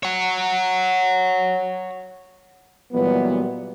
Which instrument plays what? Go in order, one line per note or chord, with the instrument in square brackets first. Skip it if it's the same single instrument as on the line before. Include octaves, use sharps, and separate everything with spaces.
[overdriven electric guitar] C#5 F#5
[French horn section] A#2 E3 F#3 G3 B3